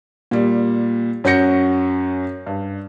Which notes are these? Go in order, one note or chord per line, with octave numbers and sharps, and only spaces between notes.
A#2 G3
F#2 C#4 F#4 G6 A#6 C#7
G2